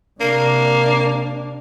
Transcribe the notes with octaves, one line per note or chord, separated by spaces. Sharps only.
C3 A#3 D4